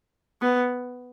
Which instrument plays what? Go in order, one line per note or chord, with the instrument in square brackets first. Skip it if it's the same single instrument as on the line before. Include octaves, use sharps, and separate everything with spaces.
[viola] B3